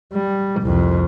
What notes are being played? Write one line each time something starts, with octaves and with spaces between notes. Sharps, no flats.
G3
C2 F2